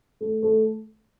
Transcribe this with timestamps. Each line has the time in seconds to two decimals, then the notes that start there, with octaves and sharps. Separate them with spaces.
0.21 A3
0.43 A3